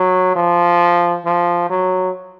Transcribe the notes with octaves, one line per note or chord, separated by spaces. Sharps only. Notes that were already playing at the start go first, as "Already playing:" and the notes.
Already playing: F#3
F3
F3
F#3